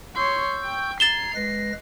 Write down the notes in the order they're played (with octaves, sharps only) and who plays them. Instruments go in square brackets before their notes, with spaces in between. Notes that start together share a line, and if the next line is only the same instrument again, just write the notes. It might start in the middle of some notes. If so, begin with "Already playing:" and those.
[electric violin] C#5 C6 [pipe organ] C#6 E6 G6
[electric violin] G5
[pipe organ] A#5 G#6 [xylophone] A6 E7 G7 [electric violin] C7
[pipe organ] G#3 B4 A#6